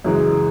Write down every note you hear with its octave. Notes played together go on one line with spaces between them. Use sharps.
F#2 C#3 E3 G#3